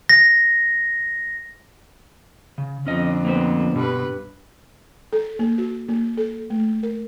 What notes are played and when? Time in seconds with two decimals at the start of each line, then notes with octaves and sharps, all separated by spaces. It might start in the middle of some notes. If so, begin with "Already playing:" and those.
0.09 A#6
2.58 C#3
2.87 F2 A#2 D3 C#4 D#5
3.25 A#3 B3 C5
3.76 G2 B2 B4
5.13 A4
5.39 A#3
5.58 F#4
5.88 A#3
6.17 A4
6.50 A3
6.83 A#4